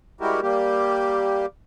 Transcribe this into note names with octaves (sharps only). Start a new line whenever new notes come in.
G3 G#3 E4 F#4 G4 A#4
G3 A#3 G4